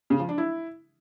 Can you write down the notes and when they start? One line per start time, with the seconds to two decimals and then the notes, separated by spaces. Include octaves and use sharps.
0.10 C#3
0.19 F3
0.29 D4
0.38 E4